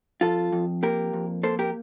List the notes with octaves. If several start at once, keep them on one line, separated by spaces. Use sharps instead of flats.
F2 F4 A4
F2
A#3 G4 A#4
F2
A#3 A4 C5
G4 A#4